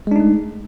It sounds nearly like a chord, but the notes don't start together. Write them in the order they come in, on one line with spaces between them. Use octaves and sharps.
G#3 D4 D#4 A3